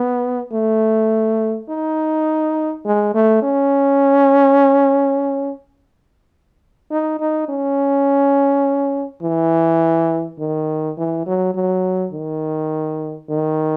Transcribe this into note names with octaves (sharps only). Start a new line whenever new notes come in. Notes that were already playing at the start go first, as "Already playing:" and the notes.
Already playing: B3
A3
D#4
G#3
A3
C#4
D#4
D#4
C#4
E3
D#3
E3
F#3
F#3
D#3
D#3